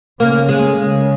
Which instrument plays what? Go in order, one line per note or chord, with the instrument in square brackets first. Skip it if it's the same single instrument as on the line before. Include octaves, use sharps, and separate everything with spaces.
[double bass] C#3 [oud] A#3
[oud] G#3
[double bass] C#3